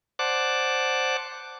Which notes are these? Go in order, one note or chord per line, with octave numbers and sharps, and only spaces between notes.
C5 D5 F#5 A5 D6 F#6